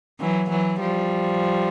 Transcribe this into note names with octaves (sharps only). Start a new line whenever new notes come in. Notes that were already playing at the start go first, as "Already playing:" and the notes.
E3 F#3
E3 F#3
F3 G3